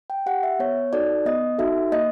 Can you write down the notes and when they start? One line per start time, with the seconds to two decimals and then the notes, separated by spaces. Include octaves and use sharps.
0.10 G5
0.26 G4 F#5
0.43 E5
0.59 B3 C#5
0.93 D#4 F#4 A4 D5
1.25 B3 D#5
1.59 D#4 F#4 A4 E5
1.92 A#3 D#5